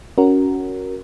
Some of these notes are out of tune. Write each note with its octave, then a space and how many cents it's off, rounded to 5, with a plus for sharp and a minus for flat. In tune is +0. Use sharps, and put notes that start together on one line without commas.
C#4 +10 F#4 +5 A#4 +0